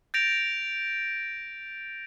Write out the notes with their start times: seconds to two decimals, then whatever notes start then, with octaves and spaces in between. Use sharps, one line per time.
0.14 G6 A6 A#6 D7 F7